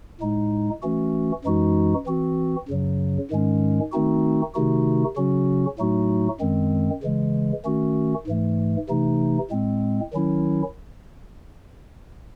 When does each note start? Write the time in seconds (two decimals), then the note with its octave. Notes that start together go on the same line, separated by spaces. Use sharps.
0.20 A2 G#3 D#4
0.82 E3 A3 C#4 F#4
1.44 F#2 E3 G#3 D#4 F#4
2.06 E3 C4 F#4
2.68 F#2 C#3 F#3
3.31 G#2 D#3 G#3 C#4
3.92 D#3 A3 C4 D#4 F#4
4.54 C3 D#3 A3 D#4 F#4
5.16 C#3 F#3 C#4 F#4
5.79 A2 F#3 A3 D#4 F#4
6.40 F#2 D#3 G#3 C4
7.03 C#3 E3 G#3
7.65 D#3 A3 C#4 F#4
8.27 G#2 E3 A3
8.89 C3 E3 A3 D#4
9.50 A2 G#3 C4
10.13 D#3 F#3 C#4 E4